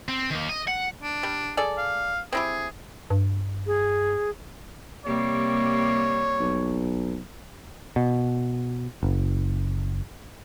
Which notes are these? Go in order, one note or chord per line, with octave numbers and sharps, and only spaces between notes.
C4
D#3 A#3
D#5
F#5
D4
G3
G#4 A4 D5
F5
C4 E4 G4 G#4
G2
G#4
C3 G3 A#3 C#5
B1
B2
F#1